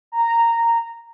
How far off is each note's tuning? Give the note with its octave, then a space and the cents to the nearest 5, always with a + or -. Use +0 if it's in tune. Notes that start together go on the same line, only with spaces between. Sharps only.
A#5 -10